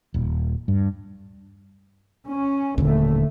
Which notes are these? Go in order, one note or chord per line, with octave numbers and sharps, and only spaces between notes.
D#1
G2
C#4
D#1 A2 D3 A3